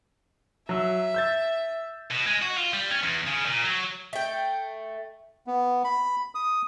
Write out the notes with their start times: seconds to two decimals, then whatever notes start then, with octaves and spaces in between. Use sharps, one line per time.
0.69 F#3 E5 E6
1.14 E6 G6 A6
2.11 B2
2.27 G#3
2.42 F#4
2.57 F4
2.73 G3
2.91 C#4
3.03 E2
3.27 C#3
3.46 A#2
3.65 F#3
4.13 A3 G5
5.47 B3
5.84 B5
6.35 D#6